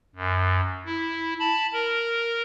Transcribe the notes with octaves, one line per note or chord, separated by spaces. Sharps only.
F#2
E4
A5 B5
A#4